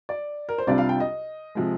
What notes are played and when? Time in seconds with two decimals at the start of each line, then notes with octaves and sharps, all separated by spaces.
0.09 D5
0.49 A#4
0.58 C5
0.67 C2 C3 G3 D4 F4 D5
0.78 F5
0.89 G5
1.00 D#5
1.55 C3 F3 G#3